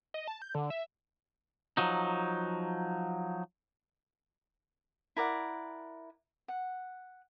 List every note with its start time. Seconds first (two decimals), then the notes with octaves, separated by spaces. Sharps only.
0.14 D#5
0.27 A5
0.42 G6
0.55 D3
0.70 E5
1.77 F3 F#3 D#4
5.17 E4 A#4 D5 F#5
6.48 F#5